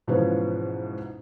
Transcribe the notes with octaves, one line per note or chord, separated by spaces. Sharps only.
G#2 B2 E3 F3 B3 C#4